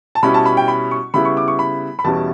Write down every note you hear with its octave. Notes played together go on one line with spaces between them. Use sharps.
A5
B2 G3 C#4 E4 B5
A5
B5
G5
B5
C#6
C#3 G3 B3 E4 B5
C#6
D6
C#6
B5
B5
E2 B2 G3 C#4 E4 A5